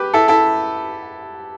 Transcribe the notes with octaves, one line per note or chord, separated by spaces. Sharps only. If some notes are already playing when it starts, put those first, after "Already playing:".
Already playing: G4 B4
E4 A4
E4 A4